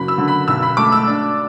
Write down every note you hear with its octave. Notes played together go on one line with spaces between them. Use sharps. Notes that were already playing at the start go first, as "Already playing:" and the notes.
Already playing: F#1 F#3 B5
E6
D3
B5
B1 E6
B5
A3 D6
E6
D4